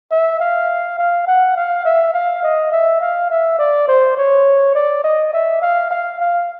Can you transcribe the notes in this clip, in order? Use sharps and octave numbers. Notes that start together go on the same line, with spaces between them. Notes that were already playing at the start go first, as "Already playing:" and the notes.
E5
F5
F5
F#5
F5
E5
F5
D#5
E5
F5
E5
D5
C5
C#5
D5
D#5
E5
F5
F5
F5